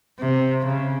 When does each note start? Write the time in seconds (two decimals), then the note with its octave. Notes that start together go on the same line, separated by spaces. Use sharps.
0.19 C3
0.65 C#3